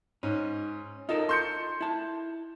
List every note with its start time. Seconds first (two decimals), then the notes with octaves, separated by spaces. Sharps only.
0.23 G#2 C#4
1.09 D#4 F4 A4 A#4
1.29 C6 G6 C#7
1.81 E4 A5